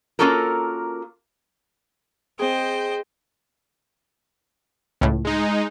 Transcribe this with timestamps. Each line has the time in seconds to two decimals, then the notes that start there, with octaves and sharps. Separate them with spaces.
0.19 A#3 C#4 F4 F#4 A4 A#4
2.39 C4 G#4 C5 D#5 G5
5.01 C#2 A2
5.25 G#3 D#4